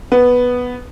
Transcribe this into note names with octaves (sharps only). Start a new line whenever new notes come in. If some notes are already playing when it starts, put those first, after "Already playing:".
B3